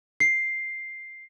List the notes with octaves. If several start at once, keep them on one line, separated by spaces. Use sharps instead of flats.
C7